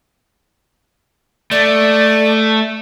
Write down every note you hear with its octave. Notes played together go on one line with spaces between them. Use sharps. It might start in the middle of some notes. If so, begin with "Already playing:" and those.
A3 D5